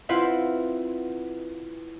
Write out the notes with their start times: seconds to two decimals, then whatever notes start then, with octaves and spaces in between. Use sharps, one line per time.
0.09 C4 E4 F4 B4 E5 F#5